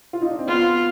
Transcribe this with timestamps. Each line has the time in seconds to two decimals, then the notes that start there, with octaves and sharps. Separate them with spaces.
0.13 F4
0.22 D#4
0.31 D4
0.39 C4
0.48 B3 F4